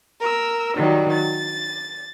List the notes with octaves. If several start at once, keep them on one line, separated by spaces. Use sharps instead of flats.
A#4 E6
D#3 F#3 G3
A6